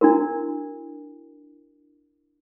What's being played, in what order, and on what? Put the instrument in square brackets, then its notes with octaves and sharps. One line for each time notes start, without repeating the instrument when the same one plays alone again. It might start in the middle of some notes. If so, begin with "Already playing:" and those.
[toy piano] D4 E4 F#4 A#4